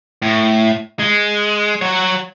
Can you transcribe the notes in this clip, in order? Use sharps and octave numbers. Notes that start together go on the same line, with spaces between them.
A2
G#3
F#3 C#5